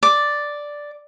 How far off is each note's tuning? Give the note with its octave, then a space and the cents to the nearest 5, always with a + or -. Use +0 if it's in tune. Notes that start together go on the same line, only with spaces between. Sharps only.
D5 +0 D6 +0